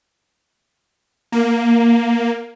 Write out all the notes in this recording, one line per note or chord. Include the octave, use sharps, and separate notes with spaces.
A#3